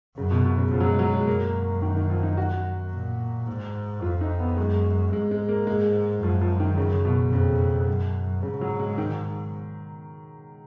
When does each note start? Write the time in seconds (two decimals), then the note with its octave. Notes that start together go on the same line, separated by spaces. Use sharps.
0.17 F#2 C#3
0.31 B2
0.45 B2
0.58 C#3
0.71 F#2 F3
0.80 F#3
0.86 G#3
0.99 F#3
1.13 G#3
1.27 F#2 A#3
1.82 D#3
1.96 D#3
2.10 F3
2.23 D#4
2.37 F#4
2.92 A#2
3.47 G#2
4.02 F2 F4
4.21 D#4
4.40 B3
4.57 F#2 G#3
5.12 G#2 G#3
5.31 G#3
5.49 A#3
5.67 G#2 G#3
6.22 F#2 F3
6.41 F3
6.60 D#3
6.77 C#3
7.05 B2
7.32 F2 C#3
7.88 F#2
8.43 G#2 C#3
8.61 F#3
8.79 G#3
8.98 D#3